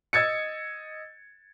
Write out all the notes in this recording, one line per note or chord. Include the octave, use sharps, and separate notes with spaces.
D#5 E6 G#6 A6 C#7